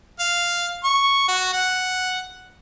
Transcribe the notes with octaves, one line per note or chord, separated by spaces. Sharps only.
F5
C#6
F#4
F#5